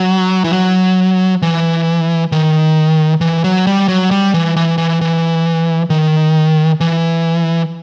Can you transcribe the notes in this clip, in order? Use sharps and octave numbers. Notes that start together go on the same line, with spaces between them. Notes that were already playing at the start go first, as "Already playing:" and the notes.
Already playing: F#3
E3
F#3
E3
D#3
E3
F#3
G3
F#3
G3
E3
E3
E3
E3
D#3
E3